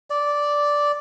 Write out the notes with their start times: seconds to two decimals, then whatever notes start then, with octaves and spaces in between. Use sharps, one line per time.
0.10 D5